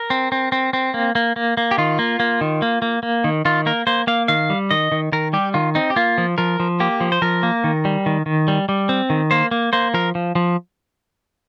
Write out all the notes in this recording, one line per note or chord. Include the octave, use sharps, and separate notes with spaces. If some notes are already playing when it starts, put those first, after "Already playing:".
Already playing: A#4
C4
C4
C4
C4
A#3
A#3
A#3
A#3
G4
D#3 F4
A#3
A#3
D#3
A#3
A#3
A#3
D#3
D#3 F4
A#3 A#4
A#3 C5
A#3 F5
D#3 F5
G3
D#3 D#5
D#3
D#3 A#4
G3 G4
D#3 F4
C4 D#4
G4
A#3 F4
F3
F3 A#4
F3
A#3 G4
F3
C5
F3 A#4
A#3
D#3
G3
D#3
D#3
G3
G3
C4
D#3
A#3 C5
A#3
A#3 C5
F3 A#4
F3
F3